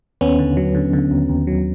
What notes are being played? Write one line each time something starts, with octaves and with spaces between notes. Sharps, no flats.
D#2 B3 C#4
D3
F#3
D3
D3
D#2
D#2
F#3